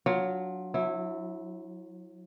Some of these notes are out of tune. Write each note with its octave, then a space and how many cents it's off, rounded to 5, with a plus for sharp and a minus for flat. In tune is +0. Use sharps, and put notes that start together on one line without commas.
F#3 +0 D4 +0 F4 +20
F#3 -40 E4 -10